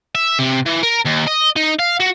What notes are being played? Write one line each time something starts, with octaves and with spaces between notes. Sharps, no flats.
E5
C3
E3
A#4
D#2
D#5
D#4
F5
F#4